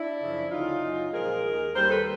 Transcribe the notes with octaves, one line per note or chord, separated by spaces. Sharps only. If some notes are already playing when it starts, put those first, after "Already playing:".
Already playing: D4 E4
F#2 C#3 F3
D2 C#3 F#3 D#4 F4
F#2 C#3 F#3
A#2 F3 G#3 G#4 A#4
D#2 D#3 G#3
D#2 D#3 G3 A#4 C5
A4 B4